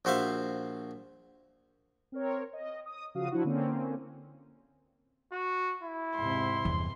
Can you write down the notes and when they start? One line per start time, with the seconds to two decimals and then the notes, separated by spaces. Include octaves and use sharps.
0.05 A#1 F#4 C5 E5 F5
2.12 C4 A#4 C#5
2.53 D#5
2.86 D#6
3.15 C#3 F3 F#4 F5 D#6
3.31 F3 D4 E4 F#4
3.45 D3 A#3 C4 C#4
5.32 F#4
5.83 E4
6.16 E2 G#2 C3 C6
6.65 E2 G2